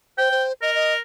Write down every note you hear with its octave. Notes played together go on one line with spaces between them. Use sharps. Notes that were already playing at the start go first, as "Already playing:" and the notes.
C5 G5
C5
A#4 D#5
D#5